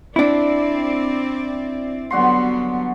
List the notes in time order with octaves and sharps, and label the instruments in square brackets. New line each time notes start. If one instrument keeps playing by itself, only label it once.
[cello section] C4 D5 [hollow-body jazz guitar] D4 E4
[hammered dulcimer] D3 F#4 C6 [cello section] F#3 G3 B3